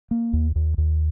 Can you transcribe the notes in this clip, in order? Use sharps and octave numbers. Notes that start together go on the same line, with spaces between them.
A#3
D#2
D#2
D#2